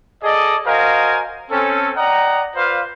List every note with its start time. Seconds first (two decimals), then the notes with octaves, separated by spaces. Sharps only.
0.23 G#4 A4 D5 D#5
0.66 F#4 A#4 C5 D#5 F5 G#5
1.50 C4 C#4 A4
1.96 D5 D#5 F#5 G5 A#5
2.56 F4 B4 C5 D5 F5